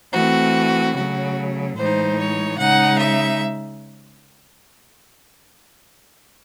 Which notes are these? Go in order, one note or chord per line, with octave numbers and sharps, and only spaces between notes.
E3 A3 C4 F#4
C#3 F#3 A3 F#4
A2 E3 G#3 D#4 C5
C#5
C#3 G#3 D#4 F#5
E5